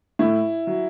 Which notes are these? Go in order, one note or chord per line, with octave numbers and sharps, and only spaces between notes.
A2 E4
F#3